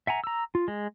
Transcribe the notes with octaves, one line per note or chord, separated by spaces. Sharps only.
E5 F#5 G#5 A#5
A#5 E6
F4
G#3